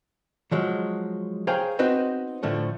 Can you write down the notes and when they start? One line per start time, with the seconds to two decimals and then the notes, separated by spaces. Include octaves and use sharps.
0.51 F3 F#3 G#3
1.47 G#4 C5 C#5 F5 G5 A#5
1.79 B3 C4 D#4 F#4 B4 C5
2.43 A2 D3 F3 A3